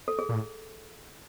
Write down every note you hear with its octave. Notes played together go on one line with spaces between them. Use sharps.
A4
G#4
A#2
A2